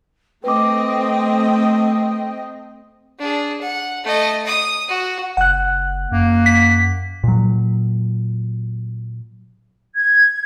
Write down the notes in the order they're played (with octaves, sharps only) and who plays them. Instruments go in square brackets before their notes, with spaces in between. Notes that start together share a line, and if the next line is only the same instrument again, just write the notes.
[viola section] A3 C4 D#5 [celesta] B4 D6 [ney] G5
[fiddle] D4 G#4
F#5
A3 D#5
D#6
F#4
[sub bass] F#1 [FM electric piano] F#5 F#6
[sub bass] F#2 [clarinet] A#3
[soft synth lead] B6
[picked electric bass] A#2 F#3
[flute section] G#6